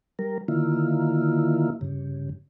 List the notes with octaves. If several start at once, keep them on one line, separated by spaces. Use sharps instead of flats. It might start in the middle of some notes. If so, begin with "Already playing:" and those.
G3 A#4
D3 D#3 A#3 E4 F4
G2 C#3